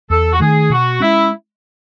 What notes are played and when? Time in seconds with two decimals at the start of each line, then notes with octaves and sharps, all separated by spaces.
0.09 E2 A4
0.32 F#4
0.40 D#3 A3 G#4
0.70 B2 F#4
1.00 G#3 C#4 E4